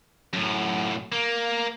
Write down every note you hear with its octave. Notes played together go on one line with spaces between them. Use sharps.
F#2 A2
A#3